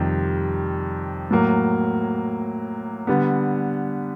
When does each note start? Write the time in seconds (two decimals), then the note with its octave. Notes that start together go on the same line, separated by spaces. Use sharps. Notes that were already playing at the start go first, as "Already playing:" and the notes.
Already playing: F2 C3 D#3 G3
1.31 A2 F#3 A#3
3.07 D3 G3 B3